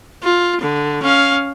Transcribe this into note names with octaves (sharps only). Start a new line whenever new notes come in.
F4
D3
C#4 F5